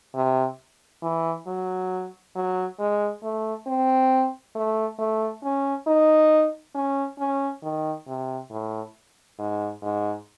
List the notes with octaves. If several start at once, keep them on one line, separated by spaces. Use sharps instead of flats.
C3
E3
F#3
F#3
G#3
A3
C4
A3
A3
C#4
D#4
C#4
C#4
D#3
C3
A2
G#2
G#2